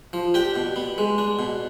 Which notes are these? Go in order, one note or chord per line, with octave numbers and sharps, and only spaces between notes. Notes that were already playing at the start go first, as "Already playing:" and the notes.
F3
D4 G4 G5
B2
B3
G#3
D4
B2